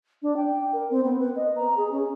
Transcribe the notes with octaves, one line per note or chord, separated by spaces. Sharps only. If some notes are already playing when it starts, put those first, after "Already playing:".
D4
G5
A#4
C4
B3
B4
D#5
A#5
G#4
C#4